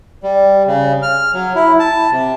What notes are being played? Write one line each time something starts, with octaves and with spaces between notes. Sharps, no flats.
G3
C#3
F6
F#3
E4
A5
C3